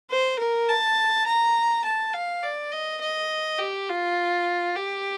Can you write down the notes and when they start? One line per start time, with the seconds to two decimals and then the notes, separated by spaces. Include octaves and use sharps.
0.11 C5
0.39 A#4
0.69 A5
1.27 A#5
1.85 A5
2.14 F5
2.43 D5
2.72 D#5
3.01 D#5
3.59 G4
3.89 F4
4.76 G4